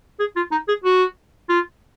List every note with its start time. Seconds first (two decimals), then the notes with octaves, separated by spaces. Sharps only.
0.20 G#4
0.36 F4
0.52 D#4
0.68 G#4
0.84 F#4
1.49 F4